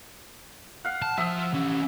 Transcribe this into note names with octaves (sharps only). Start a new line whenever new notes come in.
F5 F#5
A5
F3 E5 D#6 E6
E3 C#4